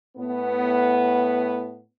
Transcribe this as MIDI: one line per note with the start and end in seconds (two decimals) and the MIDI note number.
0.16 1.83 45
0.16 1.83 59